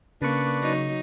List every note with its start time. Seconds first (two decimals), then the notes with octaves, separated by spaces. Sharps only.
0.22 C#3 A#3 D4 B4 D5 C#6
0.62 F#3 D#4